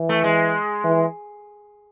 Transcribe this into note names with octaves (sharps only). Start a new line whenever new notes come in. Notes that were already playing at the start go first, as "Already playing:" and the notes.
Already playing: E3
A3
G#3
E3